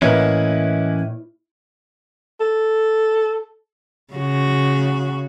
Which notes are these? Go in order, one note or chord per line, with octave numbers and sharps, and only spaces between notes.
A2 E3 A#3 C#4 E4 B4 D#5
A4
C#3 F#4